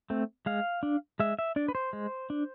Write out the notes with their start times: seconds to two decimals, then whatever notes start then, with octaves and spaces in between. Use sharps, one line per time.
0.10 A3 C4
0.46 G#3 F5
0.83 D4
1.20 G#3 E5
1.39 E5
1.56 D4 D5
1.68 B4
1.75 C5
1.93 G#3
2.30 D4